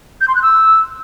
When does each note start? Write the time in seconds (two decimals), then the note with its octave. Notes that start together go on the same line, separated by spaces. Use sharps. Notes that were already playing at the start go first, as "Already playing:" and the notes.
0.21 G6
0.28 C6
0.35 F#6
0.42 E6